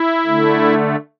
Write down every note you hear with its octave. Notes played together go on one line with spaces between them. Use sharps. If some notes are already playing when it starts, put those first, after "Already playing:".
Already playing: E4
D3 A3